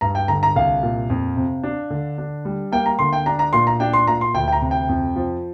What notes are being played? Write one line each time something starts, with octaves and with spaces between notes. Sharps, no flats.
G2 A#5
G5
D3 A#5
A#5
C2 F5
A#2
F2
C3
D4
D3
D4
G3
A#3 G5
A#5
D3 C6
G5
D4 A#5
A#5
A#2 C6
A#5
D4 G5
C6
A#2 A#5
C6
D2 G5
G5
A#5
C3
G5
F2
F3